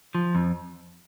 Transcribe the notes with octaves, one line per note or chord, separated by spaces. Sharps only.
F3
F2